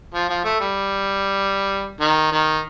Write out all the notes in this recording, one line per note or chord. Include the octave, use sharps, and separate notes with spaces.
F3
F3
A3
G3
D#3
D#3